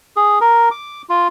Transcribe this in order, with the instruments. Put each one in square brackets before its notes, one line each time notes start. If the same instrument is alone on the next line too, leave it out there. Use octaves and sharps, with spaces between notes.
[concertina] G#4
A#4
D6
F4